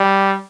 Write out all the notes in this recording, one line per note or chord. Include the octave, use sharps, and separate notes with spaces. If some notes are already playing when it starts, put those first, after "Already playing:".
Already playing: G3